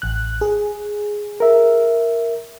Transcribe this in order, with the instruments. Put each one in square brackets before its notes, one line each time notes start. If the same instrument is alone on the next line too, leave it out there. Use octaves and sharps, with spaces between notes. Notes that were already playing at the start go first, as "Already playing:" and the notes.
[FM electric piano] A1 F#6
G#4
[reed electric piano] A#4 E5